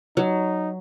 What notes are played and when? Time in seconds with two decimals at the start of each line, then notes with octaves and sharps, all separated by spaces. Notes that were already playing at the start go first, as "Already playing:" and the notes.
0.17 F#3 D#4